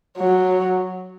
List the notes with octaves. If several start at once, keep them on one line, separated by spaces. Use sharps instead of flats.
F#3